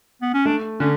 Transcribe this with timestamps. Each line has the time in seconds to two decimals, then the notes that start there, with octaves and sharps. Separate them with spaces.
0.22 B3
0.34 C#4
0.46 A3 D4
0.80 D3 C#4